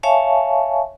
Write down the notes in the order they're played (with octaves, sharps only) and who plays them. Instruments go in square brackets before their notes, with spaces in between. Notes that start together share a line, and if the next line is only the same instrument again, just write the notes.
[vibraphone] C#5 E5 F5 G#5 A5 C#6